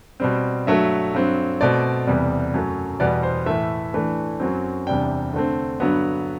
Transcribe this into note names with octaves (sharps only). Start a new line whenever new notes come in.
B2 G3 C4
G2 F#3 A3 E5
G2 F#3 C4
B2 A3 C4 D5
E2 C3 G3 B3
F#2 F#3 A3
E2 B2 G3 B3 D5
C5
A2 E3 A3 E5
A2 E3 A3 D4
F#2 F#3 C4
E2 C3 G3 D4 G5
D3 A3 C4
G2 D3 F#3 B3